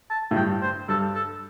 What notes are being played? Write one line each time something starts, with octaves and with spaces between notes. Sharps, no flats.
A5
A2
G2 G5
C5
G2 A4
A4